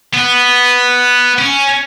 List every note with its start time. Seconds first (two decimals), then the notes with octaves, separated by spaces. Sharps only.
0.14 B3
1.39 C#4